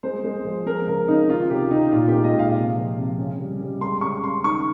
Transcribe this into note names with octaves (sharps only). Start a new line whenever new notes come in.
G#3 C5
G#3
F3
G#3 A#4
C#3 A#4
C#3 D#4
D#3 F4
C3 G4
D#3 D#4
A#2 F4
G4
G#3
D#5
A#2 F5
C3
F3
C3
C#3
G3
G3
G#3 C6
C#3 C#6
C#3 C6
D#3 C#6